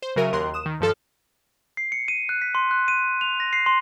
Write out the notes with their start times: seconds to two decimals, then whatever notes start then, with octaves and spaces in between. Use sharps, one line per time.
0.02 C5
0.16 C#3 F#3 F#4 A#4 E5 D#7
0.32 D#2 A#4 C6 F#6
0.54 D#6 E7
0.66 D#3
0.80 G2 F3 A4 F6
1.77 C7
1.92 C#7
2.08 D#7
2.29 F#6
2.42 B6
2.55 C6
2.71 F#6
2.88 D#7
3.21 F7
3.40 A#6
3.53 C7
3.66 C6